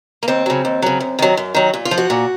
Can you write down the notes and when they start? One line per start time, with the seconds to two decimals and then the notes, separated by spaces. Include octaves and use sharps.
0.23 A#3
0.28 D#2 C4
0.46 C#3 F#3
0.65 D#2
0.82 C#3 F#3
1.00 F#2
1.19 D#3 F#3
1.37 F#2
1.54 D#3 F#3
1.74 A#2
1.85 F4
1.91 F3
1.98 F#4
2.10 A#2